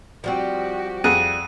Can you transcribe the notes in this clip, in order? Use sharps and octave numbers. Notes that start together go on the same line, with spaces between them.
F3 G3 C4 F#4 G4
F2 G#4 F#5 D#7